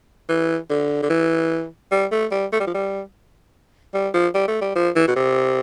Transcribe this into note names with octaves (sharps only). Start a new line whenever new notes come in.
E3
D3
D3
E3
G3
A3
G3
A3
G3
F3
G3
G3
F3
G3
A3
G3
F3
E3
B2
C3